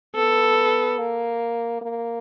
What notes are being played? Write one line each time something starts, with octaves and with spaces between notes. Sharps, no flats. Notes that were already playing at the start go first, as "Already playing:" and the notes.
B3 A4
A#3
A#3